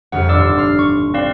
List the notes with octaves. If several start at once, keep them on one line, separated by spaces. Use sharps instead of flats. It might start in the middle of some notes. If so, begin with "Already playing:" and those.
G1 F2 F#5 F6
D#1 D4 D5 C6 D6 E6
C6 F6 C7
C#6
C4 D5 F5